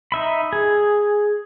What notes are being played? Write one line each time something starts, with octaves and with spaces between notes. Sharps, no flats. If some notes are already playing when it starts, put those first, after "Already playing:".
D#4 E5 B5
G#4